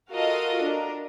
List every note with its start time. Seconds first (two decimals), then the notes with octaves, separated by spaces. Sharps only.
0.12 F4 F#4 A4 A#4 D#5 F5
0.62 D4 A#4